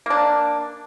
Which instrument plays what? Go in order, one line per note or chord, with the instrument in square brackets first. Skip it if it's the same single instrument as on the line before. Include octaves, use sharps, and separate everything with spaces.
[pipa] A#3 D4